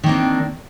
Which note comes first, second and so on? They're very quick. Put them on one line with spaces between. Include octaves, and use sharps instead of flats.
D#3 A#3 C4 D4